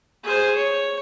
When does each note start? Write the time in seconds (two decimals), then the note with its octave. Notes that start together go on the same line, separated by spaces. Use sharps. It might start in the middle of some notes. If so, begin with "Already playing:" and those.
0.23 G#4 C5
0.55 C#5